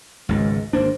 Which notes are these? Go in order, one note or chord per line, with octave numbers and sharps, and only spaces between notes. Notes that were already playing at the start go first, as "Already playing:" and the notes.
G#1 C#2 G#2 G#3
G#1 A#3 D4 C5